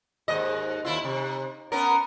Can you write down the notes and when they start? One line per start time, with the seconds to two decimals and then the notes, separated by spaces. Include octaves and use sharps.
0.28 D#2 G#2 D#5
0.85 D#2 E4 F4
1.04 C3
1.72 B3 C#4 A#4